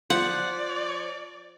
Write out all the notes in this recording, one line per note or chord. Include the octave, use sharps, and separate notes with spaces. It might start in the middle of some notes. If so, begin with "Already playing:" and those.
F3 C5 D5 F#5